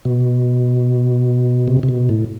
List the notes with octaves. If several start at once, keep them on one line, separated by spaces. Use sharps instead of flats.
B2
C3
C3
B2
A2